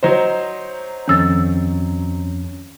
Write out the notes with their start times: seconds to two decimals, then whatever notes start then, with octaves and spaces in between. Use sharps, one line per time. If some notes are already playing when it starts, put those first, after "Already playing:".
0.03 F#3 D#4 C5
1.08 F2 D#3 C#4 E6 A6